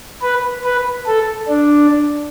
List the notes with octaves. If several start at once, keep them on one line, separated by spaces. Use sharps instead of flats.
B4
B4
A4
D4